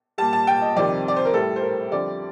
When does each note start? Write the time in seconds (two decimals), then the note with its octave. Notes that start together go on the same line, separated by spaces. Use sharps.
0.18 A#2 G3 A5
0.33 A5
0.47 G5
0.62 D#5
0.76 F2 C3 D#3 G3 D5
1.08 D5
1.16 C5
1.25 A#4
1.33 A2 G3 A4
1.56 C5
1.62 A#4
1.91 F2 D3 G3 D5